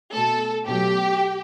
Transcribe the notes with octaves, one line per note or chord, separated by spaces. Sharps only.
B2 A3 A4
B2 F#3 A3 G4